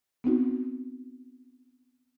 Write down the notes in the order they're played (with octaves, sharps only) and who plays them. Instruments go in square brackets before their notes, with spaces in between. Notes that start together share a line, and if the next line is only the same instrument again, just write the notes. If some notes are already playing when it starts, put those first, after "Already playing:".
[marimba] B3 C4 D#4 F#4